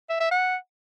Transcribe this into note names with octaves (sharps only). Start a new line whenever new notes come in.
E5
E5
F#5